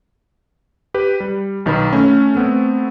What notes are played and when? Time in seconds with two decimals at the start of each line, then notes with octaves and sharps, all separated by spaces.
0.94 G4 B4
1.20 G3
1.66 B1 D#3 B4 B5
1.93 A3 C#4
2.35 A3 B3 C4